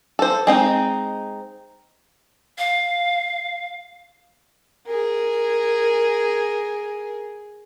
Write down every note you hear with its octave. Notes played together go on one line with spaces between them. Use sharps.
A4 C5
G#3 C4 D#4
F5
G#4 A#4